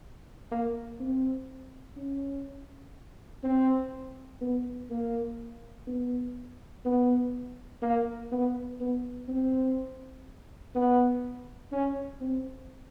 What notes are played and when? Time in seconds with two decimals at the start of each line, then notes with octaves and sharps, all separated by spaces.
0.51 A#3
1.00 C4
1.97 C#4
3.43 C4
4.41 B3
4.90 A#3
5.87 B3
6.85 B3
7.82 A#3
8.31 B3
8.80 B3
9.28 C4
10.75 B3
11.72 C#4
12.21 C4